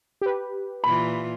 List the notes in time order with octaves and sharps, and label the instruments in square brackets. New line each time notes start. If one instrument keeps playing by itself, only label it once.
[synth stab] G4 B4
[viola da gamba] A#2 E3 F4 [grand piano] B5